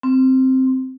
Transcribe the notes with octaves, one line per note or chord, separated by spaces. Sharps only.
C4